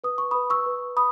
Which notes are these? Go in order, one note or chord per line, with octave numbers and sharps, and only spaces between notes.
B4 D#6
C#6
B4 B5 D#6
C#6 E6
B4
B5 D#6